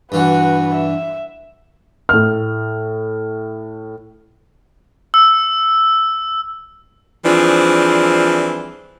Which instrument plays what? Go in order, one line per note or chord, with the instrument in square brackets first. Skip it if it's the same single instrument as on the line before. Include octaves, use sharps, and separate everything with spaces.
[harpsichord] G2 E3 [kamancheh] F#4 B4
[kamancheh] E5
[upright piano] A2 F6
[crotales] E6
[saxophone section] E3 F3 G3 C4 D4 G#4